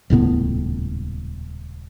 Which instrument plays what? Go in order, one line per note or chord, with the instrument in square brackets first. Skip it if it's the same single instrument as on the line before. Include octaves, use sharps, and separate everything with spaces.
[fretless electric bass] D#1 C#2 A2 B3